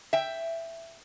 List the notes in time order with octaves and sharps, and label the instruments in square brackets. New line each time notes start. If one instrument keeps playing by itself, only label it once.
[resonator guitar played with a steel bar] E5 G5